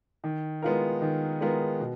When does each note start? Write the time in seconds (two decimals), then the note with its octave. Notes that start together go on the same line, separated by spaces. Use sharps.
0.24 D#3
0.62 G#3 B3 F4 A#4
1.02 D#3
1.41 G#3 B3 F4 A#4
1.80 B2